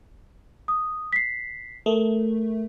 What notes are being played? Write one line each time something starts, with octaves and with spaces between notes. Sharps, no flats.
D#6
B6 C7
A3 A#4